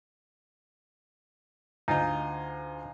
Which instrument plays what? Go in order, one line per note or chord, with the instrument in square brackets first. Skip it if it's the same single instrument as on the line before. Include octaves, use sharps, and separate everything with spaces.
[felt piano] D2 [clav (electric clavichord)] D#4 F4 [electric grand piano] D#5 F5 G#5 [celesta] A#5